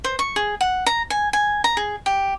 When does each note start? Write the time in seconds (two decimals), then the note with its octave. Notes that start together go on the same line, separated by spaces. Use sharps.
0.04 C5
0.19 C#6
0.36 G#4
0.61 F#5
0.86 A#5
1.10 G#5
1.33 G#5
1.64 A#5
1.77 G#4
2.06 G4